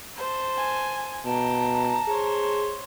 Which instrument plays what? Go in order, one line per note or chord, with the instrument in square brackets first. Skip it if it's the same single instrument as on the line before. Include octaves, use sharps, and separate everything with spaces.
[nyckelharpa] C5 A5
[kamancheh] G#5
[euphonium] B2 [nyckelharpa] G5 [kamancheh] A5 A#5
[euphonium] G#4 [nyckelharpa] C5 C#5